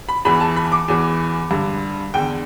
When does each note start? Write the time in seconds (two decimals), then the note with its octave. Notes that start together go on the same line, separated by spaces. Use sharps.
0.09 B5
0.25 E2 E3 B5
0.40 A5
0.56 B5
0.72 D6
0.88 E2 E3
1.51 G2 D3
2.14 E2 D3 G5